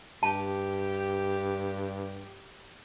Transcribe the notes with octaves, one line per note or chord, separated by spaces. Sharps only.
G2 G4 A5